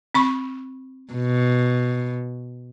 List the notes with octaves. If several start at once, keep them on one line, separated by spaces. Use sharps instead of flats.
C4 B5 C#6
B2